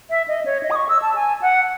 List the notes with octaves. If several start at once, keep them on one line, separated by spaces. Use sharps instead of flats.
E5
D#5
C#5
D#5
D#6
C#6
E6
A5
G#5
F#5